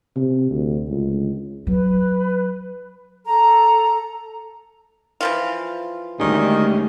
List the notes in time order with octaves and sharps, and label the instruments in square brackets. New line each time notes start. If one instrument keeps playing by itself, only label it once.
[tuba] C3
D2
C#2
[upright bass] F#3 [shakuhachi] B4
[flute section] A4 A#5
[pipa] E3 F3 F4
[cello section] D2 [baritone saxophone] D#3 [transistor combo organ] G3 G#3 C#4